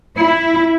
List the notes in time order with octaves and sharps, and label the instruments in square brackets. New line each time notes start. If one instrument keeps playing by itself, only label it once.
[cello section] E4